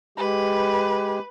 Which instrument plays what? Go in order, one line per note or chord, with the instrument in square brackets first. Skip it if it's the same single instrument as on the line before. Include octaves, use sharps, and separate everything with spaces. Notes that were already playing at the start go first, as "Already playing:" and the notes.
[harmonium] G#3 G4 [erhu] B4